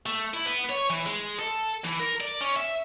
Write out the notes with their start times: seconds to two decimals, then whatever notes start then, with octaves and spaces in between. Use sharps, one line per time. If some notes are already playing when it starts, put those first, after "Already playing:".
0.06 A3
0.34 E4
0.46 B3
0.69 C#5
0.90 E3
1.06 G#3
1.39 A4
1.84 E3
2.00 A#4
2.20 D5
2.41 C#4
2.56 E5